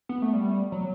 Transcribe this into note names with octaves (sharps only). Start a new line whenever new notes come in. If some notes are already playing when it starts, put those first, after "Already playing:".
B3
A3
G3
F#3